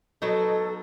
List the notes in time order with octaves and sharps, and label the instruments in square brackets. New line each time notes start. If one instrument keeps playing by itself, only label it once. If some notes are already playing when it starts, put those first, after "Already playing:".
[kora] F#3 B3 D#4 [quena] A4